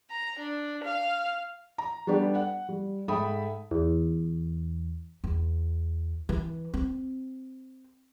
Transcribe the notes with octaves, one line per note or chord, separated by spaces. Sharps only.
A#5
D4
F5
A#5
G3 B3 D4 G4 A4
F#5
G3
G#2 A4 E5 G5 B5 D#6
E2
E2
E3
C4